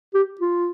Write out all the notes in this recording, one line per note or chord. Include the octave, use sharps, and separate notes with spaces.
G4
F4